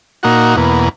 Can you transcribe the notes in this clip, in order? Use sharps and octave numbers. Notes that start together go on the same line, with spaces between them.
A#2 A#3 D#4 F#4
E2 B2 A#3